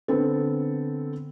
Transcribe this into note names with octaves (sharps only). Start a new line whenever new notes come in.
D3 B3 C4 A4